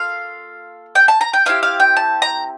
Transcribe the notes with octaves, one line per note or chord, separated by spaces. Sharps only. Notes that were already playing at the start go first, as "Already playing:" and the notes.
Already playing: A#3 F4 A4 F5
G5
A5
A#5
G5
A3 C4 E4 G4 F5
F5
G5
A5
A#5